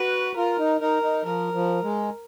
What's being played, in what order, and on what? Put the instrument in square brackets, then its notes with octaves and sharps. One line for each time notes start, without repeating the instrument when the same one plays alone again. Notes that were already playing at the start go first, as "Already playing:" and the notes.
Already playing: [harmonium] F#4 [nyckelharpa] B4
[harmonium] F4 [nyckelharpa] A#4
[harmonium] D#4
[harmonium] D#4 [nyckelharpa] A#4
[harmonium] D#4
[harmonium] F3 [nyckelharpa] A#4
[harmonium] F3
G#3